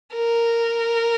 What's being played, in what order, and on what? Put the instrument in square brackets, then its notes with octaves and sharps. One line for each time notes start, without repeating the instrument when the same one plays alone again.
[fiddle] A#4